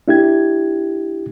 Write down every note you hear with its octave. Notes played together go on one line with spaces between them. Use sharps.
D4 E4 G4 G#6